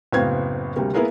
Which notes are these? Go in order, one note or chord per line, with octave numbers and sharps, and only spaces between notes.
F#1 A2 B3 C4 F5 G#6
D2 C3 G3 A#3
A#3 B3 E4 G#4 A#4 B4